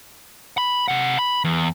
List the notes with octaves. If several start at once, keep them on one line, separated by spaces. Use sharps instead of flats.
B5
C3 F#5
B5
E2